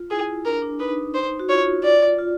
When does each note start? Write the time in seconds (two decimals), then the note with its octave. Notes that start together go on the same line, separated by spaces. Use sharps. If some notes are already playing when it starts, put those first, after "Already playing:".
Already playing: F4
0.10 E4 G#4
0.45 D4 A#4
0.62 D4
0.80 D#4 B4
1.15 C5
1.39 F#4
1.49 F4 C#5
1.84 D5
2.19 F4